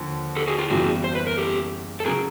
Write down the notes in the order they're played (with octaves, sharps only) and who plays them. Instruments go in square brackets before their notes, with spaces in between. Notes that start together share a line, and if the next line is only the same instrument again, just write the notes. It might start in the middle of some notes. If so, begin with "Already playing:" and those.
Already playing: [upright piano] D#2 D3 F3
[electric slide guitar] G4 A4
F#4 G#4
F4 G4
[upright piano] F#1 E2 C#3 E3 G3 [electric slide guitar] F#4 G#4
[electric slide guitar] C5
B4
A#4
G4 A4
A4
[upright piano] C#3 F#3 [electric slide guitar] G#4 A#4